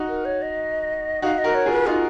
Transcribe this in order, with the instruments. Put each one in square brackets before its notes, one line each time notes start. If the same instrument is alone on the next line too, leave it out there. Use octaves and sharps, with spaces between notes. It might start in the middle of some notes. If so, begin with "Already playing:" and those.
Already playing: [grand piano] D#4 F#4
[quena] A#4
C#5
D#5
[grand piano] D#4 F#4 [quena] F5
[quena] D#5
[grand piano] F#4 A#4
[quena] C#5
[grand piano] F4 G#4
[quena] B4
[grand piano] D#4 F#4 [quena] F4